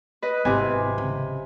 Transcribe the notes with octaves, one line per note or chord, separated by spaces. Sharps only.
B4 D#5
G#1 C3 E4 G#5
C#3